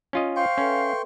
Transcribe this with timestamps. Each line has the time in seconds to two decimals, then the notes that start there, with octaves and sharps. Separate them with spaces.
0.13 C#4 F4 D#5
0.36 C5 F5 G5 C6 C#6
0.58 C#4 A4 B4 E5